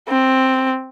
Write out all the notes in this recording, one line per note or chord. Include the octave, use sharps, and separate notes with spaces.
C4